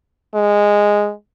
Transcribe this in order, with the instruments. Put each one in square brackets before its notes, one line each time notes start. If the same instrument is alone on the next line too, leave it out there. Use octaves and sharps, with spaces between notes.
[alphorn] G#3